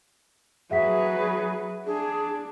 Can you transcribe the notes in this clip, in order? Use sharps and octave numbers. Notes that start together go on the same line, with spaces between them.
F#3 G#4 B4 E5 F#5 B6
D4 G#4